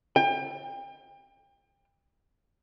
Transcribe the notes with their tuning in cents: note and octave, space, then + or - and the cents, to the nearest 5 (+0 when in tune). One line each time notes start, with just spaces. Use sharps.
G5 +30